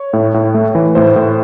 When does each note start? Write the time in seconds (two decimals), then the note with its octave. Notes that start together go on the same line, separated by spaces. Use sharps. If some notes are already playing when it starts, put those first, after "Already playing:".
Already playing: C#5
0.13 A2
0.34 A2
0.54 A3
0.75 E3
0.95 A2 C5
1.16 A2